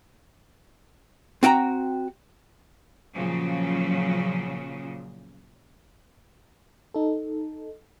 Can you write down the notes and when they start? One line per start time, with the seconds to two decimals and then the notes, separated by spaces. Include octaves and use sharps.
1.43 C4 F#4 G5 A#5
3.14 A#2 C#3 F3 F#3
6.94 D#4 A4